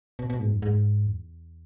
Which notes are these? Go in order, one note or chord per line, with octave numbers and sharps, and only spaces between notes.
B2
B2
G#2
F#2
G#2
E2